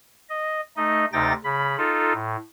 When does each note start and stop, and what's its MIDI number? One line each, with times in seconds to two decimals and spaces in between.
0.29 0.61 75
0.77 1.05 57
0.77 1.05 63
0.77 1.05 75
1.13 1.33 38
1.13 1.33 48
1.13 1.33 63
1.13 1.33 79
1.13 1.33 93
1.13 1.33 94
1.44 1.76 49
1.44 1.76 83
1.78 2.13 63
1.78 2.13 65
1.78 2.13 69
2.13 2.36 45